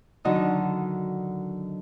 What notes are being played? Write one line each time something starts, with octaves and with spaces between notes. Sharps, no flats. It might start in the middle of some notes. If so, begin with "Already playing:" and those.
D3 D#3 F#3 D#4 D#5 D#6